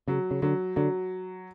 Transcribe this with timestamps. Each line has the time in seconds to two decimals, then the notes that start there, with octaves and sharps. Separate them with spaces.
0.08 C#3 F#3
0.31 C#3
0.42 D3 F#3
0.76 D3 F#3